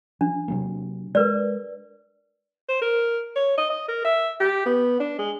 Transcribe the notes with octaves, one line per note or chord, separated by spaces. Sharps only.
F3 D4
C3 F#3 A#3
G#3 A#4 B4 D5
C5
A#4
C#5
D#5
D#5
A#4
E5
G4
B3
D4
G#3